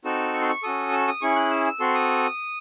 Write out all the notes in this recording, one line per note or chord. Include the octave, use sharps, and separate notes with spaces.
C4 D#4 F#4 A4 E6
C#6
C6
C#6
C#4 F#4 A4 D#6
E6
D#6
C#4 E4 G#4 C#6
F#6
E6
E6
C4 F#4 A4 C6
D#6